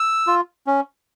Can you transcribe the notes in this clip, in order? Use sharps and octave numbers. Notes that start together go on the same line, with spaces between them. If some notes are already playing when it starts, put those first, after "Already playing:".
Already playing: E6
F4
C#4